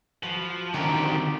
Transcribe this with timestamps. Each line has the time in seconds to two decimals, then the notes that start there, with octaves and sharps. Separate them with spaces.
0.23 F3 F#4 B4
0.74 C2 D3 D#3 A#3 C#4 F#4 G4
0.94 C4 D5